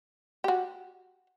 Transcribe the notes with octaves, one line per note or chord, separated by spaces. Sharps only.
F#4 G4